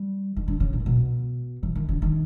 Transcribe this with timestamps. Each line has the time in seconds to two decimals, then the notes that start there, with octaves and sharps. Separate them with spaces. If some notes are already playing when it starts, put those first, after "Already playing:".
Already playing: G3
0.36 D#3
0.48 D3
0.60 C#3
0.73 B2
0.80 A#2
0.86 B2
1.63 E3
1.75 D#3
1.89 D3
2.02 D#3